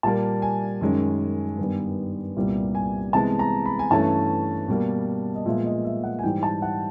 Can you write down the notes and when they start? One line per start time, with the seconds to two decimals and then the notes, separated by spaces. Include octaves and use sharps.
0.03 A#2 G3 A#3 A5
0.42 G#5
0.81 F#2 D#3 G#3 C#4
1.58 G2 D#3 G3 B3
2.36 C2 A#2 G3 B3
2.75 G#5
3.13 C3 E3 G#3 B3 A5
3.39 A#5
3.66 B5
3.79 G#5
3.90 G2 E3 A3 C#4 A5
4.68 B2 G3 A#3
5.35 D#5
5.46 A#2 F3 G#3 B3 E5
5.65 D#5
5.84 E5
6.04 F#5
6.19 G#5
6.23 G#2 E3 G3 G5
6.43 A5
6.62 F#5